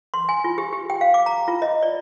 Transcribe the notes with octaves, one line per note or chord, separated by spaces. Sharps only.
C6
G#5
F4
G4
G4
G5
F5
D6
A#5
F4
D#5
D5